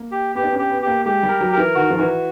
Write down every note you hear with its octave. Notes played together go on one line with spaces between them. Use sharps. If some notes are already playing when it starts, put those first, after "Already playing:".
Already playing: A#3
G4
B3 G4
D4
C#4
G4
B3
A#3 G4
G#3 G4
G3 A#4
F#3
A#4
E3
D#3 F#4
F3
E3 F#4